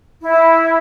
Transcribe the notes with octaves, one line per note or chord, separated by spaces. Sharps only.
E4